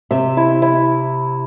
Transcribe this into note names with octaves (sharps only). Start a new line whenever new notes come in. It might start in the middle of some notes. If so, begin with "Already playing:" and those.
C3 E5
E4
E4